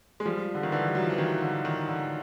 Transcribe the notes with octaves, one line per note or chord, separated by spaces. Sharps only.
G#3
F3 G3
D3
D#3
D3 E3
G3
F#3
F3
E3
D#3
D3
D#3
D3